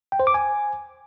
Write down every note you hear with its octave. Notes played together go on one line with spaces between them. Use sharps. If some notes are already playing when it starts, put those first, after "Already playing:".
G5
C5
D6
G#5